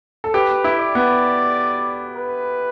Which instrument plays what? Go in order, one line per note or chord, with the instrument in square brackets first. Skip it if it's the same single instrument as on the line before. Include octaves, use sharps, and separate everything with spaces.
[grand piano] A4
[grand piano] G4 [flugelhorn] B4
[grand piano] E4
[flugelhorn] D5
[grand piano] B3
[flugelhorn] B4